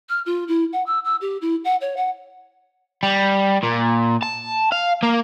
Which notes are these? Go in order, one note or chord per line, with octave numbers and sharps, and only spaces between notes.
F6
F4
E4
F#5
E6
E6
G4
E4
F#5
C#5
F#5
G3
A#2
A5
F5
A#3